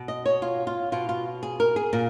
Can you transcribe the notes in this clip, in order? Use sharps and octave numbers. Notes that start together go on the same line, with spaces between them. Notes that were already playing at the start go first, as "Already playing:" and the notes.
Already playing: B2
D#5
C#5
F4
F4
B2 F4
F4
G#4
A#4
G#4
A#2 A#4